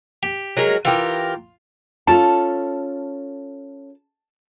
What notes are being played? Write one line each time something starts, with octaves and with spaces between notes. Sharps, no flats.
G4
F#3 G#3 A#4
E3 F4 G4 A#4
C#4 F4 A4 A5